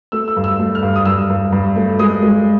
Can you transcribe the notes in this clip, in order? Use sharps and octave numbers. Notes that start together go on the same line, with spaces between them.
A3 E6
E6
G2
E6
A3
F6
G2
D#6
G2 E6
G2
G2
A3
G#3 D#6
G#3